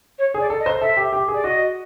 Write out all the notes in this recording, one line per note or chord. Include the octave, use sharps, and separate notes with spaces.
C#5
G#4
D5
A4
D#5
C5
A4 E5
G4
G4
G#4
D5
F#4 D#5